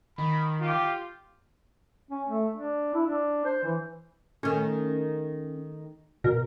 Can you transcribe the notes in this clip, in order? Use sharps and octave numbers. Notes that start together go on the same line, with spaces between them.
D#3 B5
F4 G4
C#4
A3
D4
E4
D4
C5
E3
D#3 A3 C#4
B2 A#4